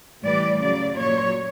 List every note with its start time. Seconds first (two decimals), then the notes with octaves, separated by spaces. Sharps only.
0.23 A2 E3 G3 D5
0.60 C#3 F#3 D5
0.97 A#2 F#3 C#5